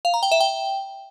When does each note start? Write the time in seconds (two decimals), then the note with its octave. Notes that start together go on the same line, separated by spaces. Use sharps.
0.05 F5
0.14 A#5
0.23 G5
0.32 E5
0.40 G5